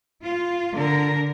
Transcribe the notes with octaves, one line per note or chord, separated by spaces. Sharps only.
F4
D3 A#4